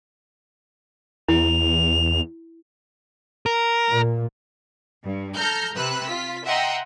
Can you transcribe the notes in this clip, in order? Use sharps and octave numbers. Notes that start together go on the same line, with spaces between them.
E2 E4 F7
A#4
A#2
G2
A4 A#5 F6 G6
C3 B4 E6 F#6
F4 B6
D#5 E5 F#5 G5 A#5 C6